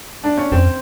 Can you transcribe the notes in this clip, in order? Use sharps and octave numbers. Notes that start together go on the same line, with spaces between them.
D4
C#4
F2 C4